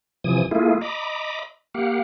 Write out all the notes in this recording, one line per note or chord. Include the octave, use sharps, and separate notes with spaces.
C3 E3 F3 G#5 D#6
A3 A#3 E4 F4 G#4
D#5 A#5 B5 D6
A#3 G4 F5 F#5